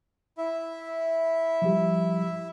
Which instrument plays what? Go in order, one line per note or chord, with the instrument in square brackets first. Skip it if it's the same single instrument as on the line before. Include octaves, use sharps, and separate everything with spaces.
[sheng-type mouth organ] E4 E5
[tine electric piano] F3 G3 G4